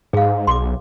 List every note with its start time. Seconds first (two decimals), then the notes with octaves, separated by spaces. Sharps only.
0.13 G#2 G#4 F5
0.47 B1 C6 D6